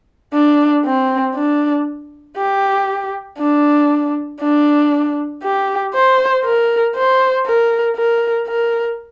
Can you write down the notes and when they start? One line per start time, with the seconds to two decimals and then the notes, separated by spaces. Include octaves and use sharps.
0.33 D4
0.84 C4
1.35 D4
2.37 G4
3.38 D4
4.40 D4
5.42 G4
5.94 C5
6.44 A#4
6.95 C5
7.46 A#4
7.96 A#4
8.47 A#4